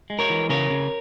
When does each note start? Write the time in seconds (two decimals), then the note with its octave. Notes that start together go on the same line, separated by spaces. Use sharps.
0.10 G#3
0.19 A#4 C#5
0.30 E3
0.50 C#3 A#4 C#5
0.70 C#3